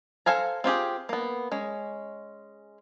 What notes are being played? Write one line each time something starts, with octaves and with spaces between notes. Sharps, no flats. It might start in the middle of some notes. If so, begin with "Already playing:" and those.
A4 C5 F5 G#5 A#5
C4 F4 G4 G#4
A#3 B3
G#3 C#4